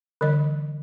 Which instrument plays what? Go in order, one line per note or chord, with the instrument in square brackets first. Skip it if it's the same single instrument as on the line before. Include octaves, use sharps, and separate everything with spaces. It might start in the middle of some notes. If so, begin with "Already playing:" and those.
[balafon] D3 E3 G3 C#5 D#5